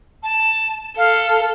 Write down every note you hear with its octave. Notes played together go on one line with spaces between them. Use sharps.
A5
A4 F5